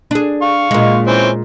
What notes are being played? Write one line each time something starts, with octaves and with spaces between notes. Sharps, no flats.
D4 G#4
F5 C#6
A#2 G#3
E3 C4 C#4